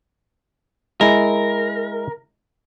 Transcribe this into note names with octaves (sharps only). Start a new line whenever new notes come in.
G#3 E4 A#4